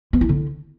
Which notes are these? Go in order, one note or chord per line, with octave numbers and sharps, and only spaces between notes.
B3
E4
D3